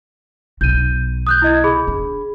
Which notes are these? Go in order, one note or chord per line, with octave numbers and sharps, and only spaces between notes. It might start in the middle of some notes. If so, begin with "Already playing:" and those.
B1 B2 G6 D#7
D#6 F#6 G6
E4 D#5 G#6
G#4 B5
D4